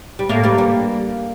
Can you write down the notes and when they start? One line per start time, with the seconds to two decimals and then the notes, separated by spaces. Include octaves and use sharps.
0.19 G3
0.29 A2 A3 A#3
0.43 G2 G3
0.58 G3